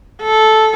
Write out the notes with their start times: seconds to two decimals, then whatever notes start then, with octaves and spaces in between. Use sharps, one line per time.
0.22 A4